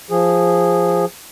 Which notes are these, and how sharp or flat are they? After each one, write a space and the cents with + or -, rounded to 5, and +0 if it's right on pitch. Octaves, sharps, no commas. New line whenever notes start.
F3 +0 G#4 -15